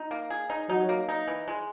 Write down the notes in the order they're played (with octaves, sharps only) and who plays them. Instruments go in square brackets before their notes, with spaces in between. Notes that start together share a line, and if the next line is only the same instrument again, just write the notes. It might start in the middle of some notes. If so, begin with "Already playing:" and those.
Already playing: [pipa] D#4
A#3
G#4
D#4
[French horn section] F#3 [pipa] D#4
[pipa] A#3
D#4
E3
G#3